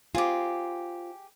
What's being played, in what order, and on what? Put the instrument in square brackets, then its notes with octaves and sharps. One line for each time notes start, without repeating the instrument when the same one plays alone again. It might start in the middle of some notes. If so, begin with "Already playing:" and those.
[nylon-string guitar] C4 F4 [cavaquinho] G4 G#4